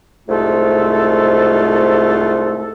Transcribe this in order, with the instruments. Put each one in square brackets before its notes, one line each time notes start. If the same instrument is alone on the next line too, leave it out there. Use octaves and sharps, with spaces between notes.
[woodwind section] C2 G#2 G#3 A3 F4 A4